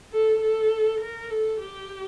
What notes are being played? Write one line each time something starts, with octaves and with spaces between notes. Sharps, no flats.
A4
A4
A#4
A4
G4